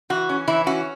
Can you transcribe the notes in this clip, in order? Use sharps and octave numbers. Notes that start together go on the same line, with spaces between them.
E3 F#4
C#4
E3 E4
C#4 F#4